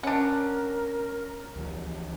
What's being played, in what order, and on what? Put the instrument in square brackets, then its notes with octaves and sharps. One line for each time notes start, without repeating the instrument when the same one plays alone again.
[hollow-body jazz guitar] C#4 [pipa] D4 F#5 [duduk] A#4
[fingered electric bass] D2 E3 F3